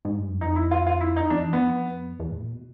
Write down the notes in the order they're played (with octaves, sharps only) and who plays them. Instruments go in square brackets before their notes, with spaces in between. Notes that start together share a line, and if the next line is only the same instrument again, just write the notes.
[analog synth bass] G#2
G2
F#2
[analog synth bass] F2 [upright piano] D#4
[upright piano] E4
F4
F4
E4
D#4
[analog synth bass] F2 [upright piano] D4
[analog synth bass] E2
[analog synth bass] F2 [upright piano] B3
[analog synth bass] E2
A2
A#2
B2